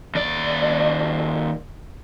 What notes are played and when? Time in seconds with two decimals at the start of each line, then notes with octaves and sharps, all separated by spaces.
0.15 D#2 D5